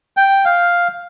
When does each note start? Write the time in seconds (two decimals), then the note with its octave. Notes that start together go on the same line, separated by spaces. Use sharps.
0.17 G5
0.45 F5